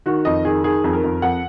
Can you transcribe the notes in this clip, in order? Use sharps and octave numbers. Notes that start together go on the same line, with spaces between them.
D#3 F#4
F2 D#5
D#3 G#4
D#3 G#4
F2 G#4
A#4
F2
F2 F#5